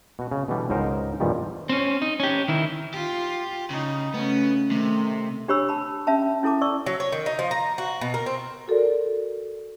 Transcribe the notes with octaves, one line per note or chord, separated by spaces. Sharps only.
B2 F#4
C#3
B2 D3 E3 G3
C#2 G#2 D#4 A#4 C5
E2 G2 A#2 D#3 F3 G3
C4 C#4
D#4
C#4 G4
D#3 E4
F4 G4
C#3 D#4
C#3 A3 B3 C#4
C3 D#3 A3
D4 G4 C#5 B5 E6
A5 B5
C#4 E5 A5 B5
C#4 E4 A4 A5 D6
D5 C#6 E6
F#3
C#5
D#3
D#4
F3
A#5
F#4
B2
A#4
C4
F#4 A4 A#4 D5